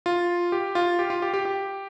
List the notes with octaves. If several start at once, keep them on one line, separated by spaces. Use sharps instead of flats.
F4
G4
F4
G4
F4
G4
G4
G4